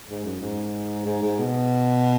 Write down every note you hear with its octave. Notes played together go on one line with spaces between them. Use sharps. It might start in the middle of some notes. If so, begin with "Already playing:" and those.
G#2
F#2
G#2
G#2
G#2
B2